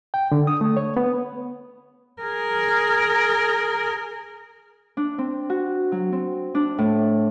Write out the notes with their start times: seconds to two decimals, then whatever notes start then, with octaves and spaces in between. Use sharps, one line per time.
0.14 G5
0.32 D3
0.47 D#6
0.61 A3
0.77 C#5
0.97 B3
2.22 G#4 A#4
4.97 D4
5.18 C4
5.50 F#4
5.92 F#3
6.12 C4
6.55 D4
6.78 A2